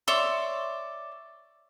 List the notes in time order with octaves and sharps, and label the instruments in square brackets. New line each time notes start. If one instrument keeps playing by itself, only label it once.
[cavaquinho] C#5 D5 E5 C6